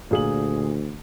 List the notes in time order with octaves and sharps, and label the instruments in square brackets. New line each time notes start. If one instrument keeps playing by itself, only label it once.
[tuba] D2 [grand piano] A#2 G#4 F#7